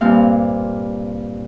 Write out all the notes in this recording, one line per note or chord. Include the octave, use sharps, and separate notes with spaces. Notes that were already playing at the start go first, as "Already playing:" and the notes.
G2 A#2 C4 F5